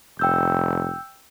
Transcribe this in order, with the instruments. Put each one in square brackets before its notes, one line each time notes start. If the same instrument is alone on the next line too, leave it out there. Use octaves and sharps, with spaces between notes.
[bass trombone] F1 [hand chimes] G5 E6 G6